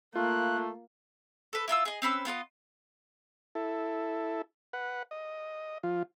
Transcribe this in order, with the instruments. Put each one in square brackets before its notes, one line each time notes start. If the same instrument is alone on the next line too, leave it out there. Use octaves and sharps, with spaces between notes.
[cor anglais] A3 [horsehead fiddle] A#3 [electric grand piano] F4 [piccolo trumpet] F#6
[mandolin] A4 B4
E4 F4 B5 E6
G#4 D#5
C4 C#4 B4 E6
B3 F4 B4 D#5
[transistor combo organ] E4 A4
B4 F#5
D#5
F3 F4